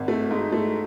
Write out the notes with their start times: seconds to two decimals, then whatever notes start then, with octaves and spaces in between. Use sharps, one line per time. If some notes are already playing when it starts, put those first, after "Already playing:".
Already playing: G#1
0.08 A3
0.31 G#2
0.52 A3